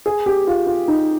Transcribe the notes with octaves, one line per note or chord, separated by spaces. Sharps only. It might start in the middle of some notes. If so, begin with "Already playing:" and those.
G#4
G4
F4
F4
D#4